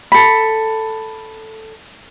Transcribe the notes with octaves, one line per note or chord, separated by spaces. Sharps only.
A4 B5